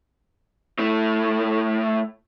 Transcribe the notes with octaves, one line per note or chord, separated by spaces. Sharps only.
A2 A3